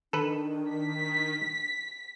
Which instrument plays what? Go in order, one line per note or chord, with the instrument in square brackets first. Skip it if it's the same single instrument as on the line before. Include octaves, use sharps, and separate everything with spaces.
[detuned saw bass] D#3 [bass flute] D4 [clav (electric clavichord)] A4 B4
[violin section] B6